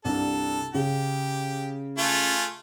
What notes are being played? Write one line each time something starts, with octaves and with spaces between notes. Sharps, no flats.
C2 G2 A4
C#3 G4
A3 F4 G#4